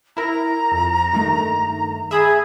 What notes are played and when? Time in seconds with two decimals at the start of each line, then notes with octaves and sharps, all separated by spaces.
0.17 E4 A#4 A#5
0.72 F2
1.13 G2 D#3 A3
2.11 G#4 E5 B5 D#6